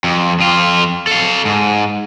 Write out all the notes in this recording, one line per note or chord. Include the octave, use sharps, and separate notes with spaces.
F2
F2 F4
A4 F5
G#2